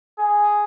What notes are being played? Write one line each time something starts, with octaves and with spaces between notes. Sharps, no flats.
G#4